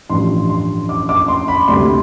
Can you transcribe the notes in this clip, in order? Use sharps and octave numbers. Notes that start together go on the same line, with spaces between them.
A1 G2 F3 C6
C6
D6
D6
C6
B5
D2 C3 G3 C6